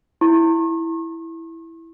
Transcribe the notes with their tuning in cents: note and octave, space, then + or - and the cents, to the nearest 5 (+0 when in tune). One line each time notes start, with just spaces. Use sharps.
E4 +0 C#6 -45